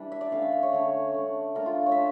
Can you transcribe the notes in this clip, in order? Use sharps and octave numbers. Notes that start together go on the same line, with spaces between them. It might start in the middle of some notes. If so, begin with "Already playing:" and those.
Already playing: E3 G3 D4
E5
D5
D3 A3 C#4 F5
E5
F5
C#5
D3 A3 C#4
D3 A3 D4
D3 A3 D4 A#4
F4
C#5
D4 E5